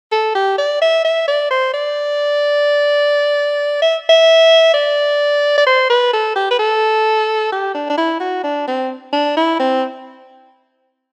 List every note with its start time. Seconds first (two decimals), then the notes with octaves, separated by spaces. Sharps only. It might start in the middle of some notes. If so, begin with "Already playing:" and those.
0.12 A4
0.35 G4
0.58 D5
0.82 E5
1.05 E5
1.28 D5
1.51 C5
1.74 D5
3.82 E5
4.09 E5
4.74 D5
5.58 D5
5.67 C5
5.90 B4
6.13 A4
6.36 G4
6.51 B4
6.59 A4
7.52 G4
7.75 D4
7.90 D4
7.97 E4
8.20 F#4
8.44 D4
8.68 C4
9.13 D4
9.37 E4
9.60 C4